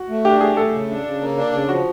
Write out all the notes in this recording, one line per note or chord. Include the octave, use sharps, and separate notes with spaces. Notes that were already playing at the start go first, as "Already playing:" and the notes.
Already playing: F#4
A3
D4 G4
A3 G#4
A3 A4
C#3
D4
C#3
A#3
D4
C#3
F3 F#4